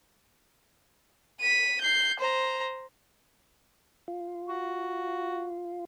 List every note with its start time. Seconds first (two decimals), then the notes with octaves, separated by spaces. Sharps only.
1.40 B6 D#7
1.80 G6 C7
2.19 C5 A#5
4.08 F4
4.49 F#4